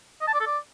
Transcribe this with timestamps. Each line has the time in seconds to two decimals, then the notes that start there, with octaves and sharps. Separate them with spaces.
0.21 D#5
0.27 A5
0.34 D5
0.40 A4
0.47 D5